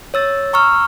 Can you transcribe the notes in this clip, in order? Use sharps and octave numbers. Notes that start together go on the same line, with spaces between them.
C#5 E6 A6
A#5 C#6 E6 F6